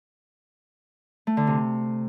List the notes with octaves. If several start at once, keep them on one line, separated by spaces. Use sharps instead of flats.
A3
D3
C3